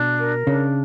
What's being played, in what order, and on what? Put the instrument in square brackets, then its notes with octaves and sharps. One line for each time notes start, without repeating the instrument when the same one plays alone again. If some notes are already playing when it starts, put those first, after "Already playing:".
Already playing: [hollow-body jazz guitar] B2 [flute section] D4
[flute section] A#4
[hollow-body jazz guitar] C#3 [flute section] D4